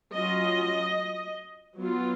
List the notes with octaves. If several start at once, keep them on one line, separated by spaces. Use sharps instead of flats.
F#3 C#4 F4 D#5
F#3 B3 F4